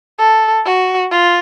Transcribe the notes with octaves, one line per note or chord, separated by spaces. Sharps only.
A4
F#4
F4